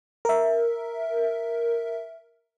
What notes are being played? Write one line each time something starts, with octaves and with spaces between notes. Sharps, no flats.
A#4 E5